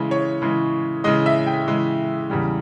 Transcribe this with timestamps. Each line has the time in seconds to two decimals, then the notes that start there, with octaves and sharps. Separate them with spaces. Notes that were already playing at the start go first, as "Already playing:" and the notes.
Already playing: C#3 E3 G#3
0.11 C#5
0.42 C#3 E3 G#3
1.04 C#3 E3 G#3 D#5
1.26 E5
1.47 G5
1.67 C#3 E3 G#3
2.30 E2 C#3 G3